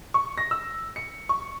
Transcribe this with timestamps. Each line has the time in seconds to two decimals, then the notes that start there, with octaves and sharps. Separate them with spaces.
0.14 C#6
0.38 A#6
0.51 E6
0.96 C#7
1.29 C#6